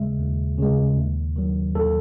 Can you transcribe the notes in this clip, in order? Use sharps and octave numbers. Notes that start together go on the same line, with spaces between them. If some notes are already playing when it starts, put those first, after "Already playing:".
Already playing: D#2 C#3 G#3 E5
D#2
C#3 G#3
D#2
D#3 F#3
D#2 A4